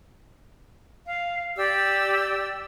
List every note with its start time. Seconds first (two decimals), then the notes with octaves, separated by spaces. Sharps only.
1.06 F5
1.57 G4 D5 E6